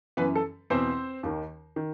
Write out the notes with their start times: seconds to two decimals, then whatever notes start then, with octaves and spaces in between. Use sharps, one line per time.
0.17 F#2 E3 B3 B4
0.36 A4
0.70 E2 B2 C4 C5
1.23 D#2 D#3
1.76 D#3